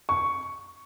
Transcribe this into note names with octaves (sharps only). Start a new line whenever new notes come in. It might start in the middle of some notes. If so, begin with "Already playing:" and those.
C#6